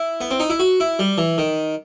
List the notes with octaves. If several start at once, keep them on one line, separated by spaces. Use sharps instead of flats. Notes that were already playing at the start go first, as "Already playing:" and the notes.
Already playing: E4
B3
C4
D#4
E4
F#4
E4
G3
E3
D#3